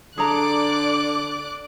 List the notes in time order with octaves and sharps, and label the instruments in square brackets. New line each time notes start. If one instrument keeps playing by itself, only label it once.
[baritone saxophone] D3 [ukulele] G#4 A4 A#5 [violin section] D5 D6 F#6